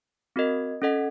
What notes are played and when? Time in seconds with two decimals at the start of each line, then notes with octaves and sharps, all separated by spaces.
0.36 C4 F#4 A#4 D#5
0.82 C#4 A4 D#5 F#5